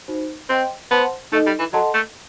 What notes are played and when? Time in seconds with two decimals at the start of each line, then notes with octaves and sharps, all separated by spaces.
0.08 D#4 F#4 C5
0.49 C4 C5 D#5 G5 C6
0.91 B3 C5 F#5 A5 C6
1.32 A3 D#4 A4 D#5
1.46 G3
1.59 E3
1.73 F#3 A4 D#5 F#5 A5 C6
1.94 A3